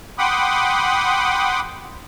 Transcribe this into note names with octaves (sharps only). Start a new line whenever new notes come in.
F#5 G5 B5 C6 D6 D#6